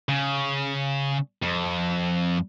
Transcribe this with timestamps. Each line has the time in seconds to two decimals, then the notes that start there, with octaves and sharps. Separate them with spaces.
0.09 C#3
1.42 F2